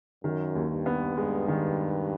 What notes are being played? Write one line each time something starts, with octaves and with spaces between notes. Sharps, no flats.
F#2 D#3
D#2
G2
B3
G2 G#3
D#3